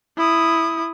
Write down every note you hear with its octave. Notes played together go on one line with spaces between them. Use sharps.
E4 D#6